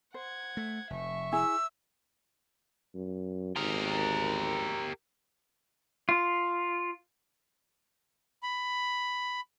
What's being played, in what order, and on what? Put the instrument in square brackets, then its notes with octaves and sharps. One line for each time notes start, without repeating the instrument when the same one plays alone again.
[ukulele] C5 [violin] F#5 G#6
[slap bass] A3
[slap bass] F1 [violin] E5 C#6
[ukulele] E4 G#4 G#5 [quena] E6
[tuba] F#2
[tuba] G#1 [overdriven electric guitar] G4 A#4
[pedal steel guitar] F4
[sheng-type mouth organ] B5